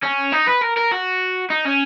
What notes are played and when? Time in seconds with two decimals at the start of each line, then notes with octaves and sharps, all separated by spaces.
0.03 C#4
0.33 D#4
0.48 B4
0.62 A#4
0.77 A#4
0.92 F#4
1.51 D#4
1.65 C#4